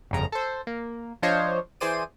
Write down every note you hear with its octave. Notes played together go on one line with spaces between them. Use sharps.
G1 F2 C#3 A#5
A4 C5
A#3
F3 D4 F4 C5 C#5 D#5
E3 G#4 C5 D5 D#7